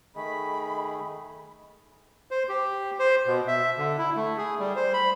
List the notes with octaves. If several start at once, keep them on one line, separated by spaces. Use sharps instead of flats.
D#3 A3 G#4 D#5 B5
C5
G4
C5
B2
E5
D3
E4
A3
G#4
G3
C5
B5